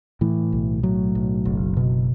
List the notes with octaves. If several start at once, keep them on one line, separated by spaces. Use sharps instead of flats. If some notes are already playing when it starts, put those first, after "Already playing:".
A2 E3
B1
A2 F#3
B1
F#1
B2